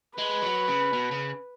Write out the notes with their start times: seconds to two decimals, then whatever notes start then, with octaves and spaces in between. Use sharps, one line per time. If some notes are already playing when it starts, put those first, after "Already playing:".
0.18 G#3 B4
0.42 F#3
0.68 C#3
0.93 B2
1.11 C#3